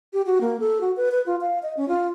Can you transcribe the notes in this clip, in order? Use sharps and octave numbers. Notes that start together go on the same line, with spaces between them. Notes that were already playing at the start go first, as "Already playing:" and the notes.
G4
F#4
A#3
A4
F#4
B4
B4
F4
F5
D#5
C#4
F4